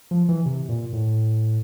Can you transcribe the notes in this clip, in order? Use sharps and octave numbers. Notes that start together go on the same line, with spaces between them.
F3
E3
C3
A#2
A2